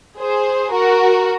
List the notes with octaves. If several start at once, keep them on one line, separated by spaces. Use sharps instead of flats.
G#4 C5
F#4 A#4